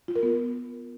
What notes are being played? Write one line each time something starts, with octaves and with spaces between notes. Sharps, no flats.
F4
A#4
B3